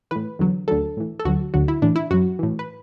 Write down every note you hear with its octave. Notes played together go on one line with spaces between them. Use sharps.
A2 E3 B4
E2 D3 F#3
D2 D3 F#3 A4
A2 E3
A4
D2 D3 F#3 F#4
D2 D3 F#3 F#4
E4
A2 E3 D4
E4
F#2 F#3 F#4
A2 E3
B4